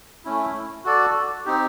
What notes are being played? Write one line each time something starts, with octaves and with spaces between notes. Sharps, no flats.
A3 C#4 E4
F#4 A4 D5
C4 D#4 G4